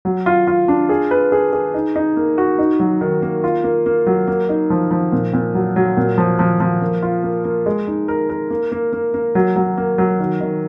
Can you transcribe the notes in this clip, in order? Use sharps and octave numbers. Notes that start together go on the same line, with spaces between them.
F#3
F4
F4
D4
G#4
B4
G#4
G#4
D#4
D#4
A#3
F#4
D#4
F#3
D#3
A#3
F4
A#3
A#3
F#3
A#3
D#4
F3
F3
A#2
A#2
F#3
F#3
A#2
F3
F3
F3
A#3
F4
A#3
A#3
G#3
D#4
A#4
A#4
A#3
A#3
A#3
A#3
F#3
F#3
A#3
F#3
D#3
D#3